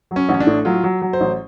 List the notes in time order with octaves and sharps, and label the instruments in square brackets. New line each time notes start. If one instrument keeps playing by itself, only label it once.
[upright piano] F#3
[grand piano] C#4
[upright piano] A1
[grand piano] C#4
D4
[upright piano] A2
[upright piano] F#3 [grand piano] F4
[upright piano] F#3
F#3
[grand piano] C5
[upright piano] A1